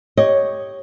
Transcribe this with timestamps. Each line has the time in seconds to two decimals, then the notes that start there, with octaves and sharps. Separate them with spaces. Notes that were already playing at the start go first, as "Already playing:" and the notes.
0.17 G4 C#5 D#5